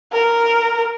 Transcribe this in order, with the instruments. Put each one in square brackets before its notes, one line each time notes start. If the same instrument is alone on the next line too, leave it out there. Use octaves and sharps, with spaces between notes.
[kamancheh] A#4